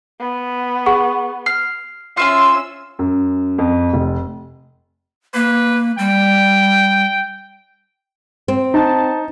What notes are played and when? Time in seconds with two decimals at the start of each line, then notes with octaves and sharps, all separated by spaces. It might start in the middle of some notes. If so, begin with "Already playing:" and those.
0.20 B3
0.86 G#4 F#5 C#6
1.46 F6 C7
2.17 C#4 F4 E5 C6 E6
2.99 F#2
3.59 F2
3.93 F1
5.34 A#3 B4
5.99 G3 G5
8.48 C4
8.74 D#4 A5